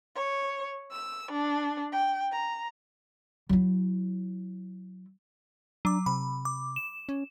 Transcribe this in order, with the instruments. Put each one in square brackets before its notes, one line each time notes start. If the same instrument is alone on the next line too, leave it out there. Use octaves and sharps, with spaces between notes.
[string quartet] C#5
E6
D4
G5
A#5
[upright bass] F#3 E4
[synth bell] F#3 D6 [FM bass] D4
[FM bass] C3 [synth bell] B5
[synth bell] D6
E7
[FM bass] C#4